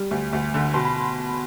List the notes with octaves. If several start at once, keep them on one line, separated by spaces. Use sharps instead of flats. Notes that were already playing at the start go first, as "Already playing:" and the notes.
Already playing: G3
D2
D2
D3
B2 C6
B5